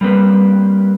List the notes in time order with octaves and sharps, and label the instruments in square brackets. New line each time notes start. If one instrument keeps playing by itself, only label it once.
[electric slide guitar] G3 A#3 C4 B4